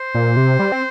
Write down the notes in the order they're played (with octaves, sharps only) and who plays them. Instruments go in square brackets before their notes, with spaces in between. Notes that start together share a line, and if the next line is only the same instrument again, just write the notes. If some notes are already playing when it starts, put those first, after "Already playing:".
Already playing: [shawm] C5
[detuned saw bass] A#2
C3
G3
C4